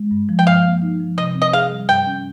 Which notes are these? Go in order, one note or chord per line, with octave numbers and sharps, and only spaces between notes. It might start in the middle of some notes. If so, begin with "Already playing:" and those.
Already playing: G#3
G2
F3
G5
G2 F5
A#3
D#4
F3
C3 D#5
C4
D#5
G#4 F5
G3
G2 G5
C#4